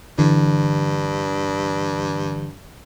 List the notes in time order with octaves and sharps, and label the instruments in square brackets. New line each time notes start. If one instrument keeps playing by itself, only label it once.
[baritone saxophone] G2 [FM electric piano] D3 E3